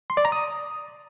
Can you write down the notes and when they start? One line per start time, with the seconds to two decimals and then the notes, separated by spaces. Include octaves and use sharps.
0.10 C6
0.17 D5
0.25 A#5
0.32 D#6